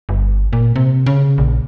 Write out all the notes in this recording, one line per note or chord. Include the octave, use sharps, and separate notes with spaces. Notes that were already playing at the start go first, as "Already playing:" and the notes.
G1
A#2
C3
C#3
A#1